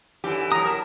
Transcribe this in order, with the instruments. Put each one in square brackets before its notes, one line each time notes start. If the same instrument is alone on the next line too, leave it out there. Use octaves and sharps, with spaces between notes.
[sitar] F#2 D3 E3 [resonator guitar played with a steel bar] G4
[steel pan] A#5 [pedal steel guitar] D#6
[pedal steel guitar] A#4 A5